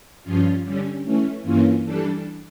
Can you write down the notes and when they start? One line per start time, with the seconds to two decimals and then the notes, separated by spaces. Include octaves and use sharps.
0.24 G2 F3 C#4 F4
0.64 D3 G3 C#4
1.04 E3 A3 C#4
1.44 G2 E3 A#3 C#4 F4
1.84 E3 G3 D4 A4